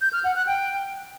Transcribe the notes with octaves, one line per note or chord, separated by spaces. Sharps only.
G6
F6
F#5
F#6
G5